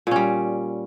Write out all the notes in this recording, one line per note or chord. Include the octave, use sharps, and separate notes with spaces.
A#2 G3 C#4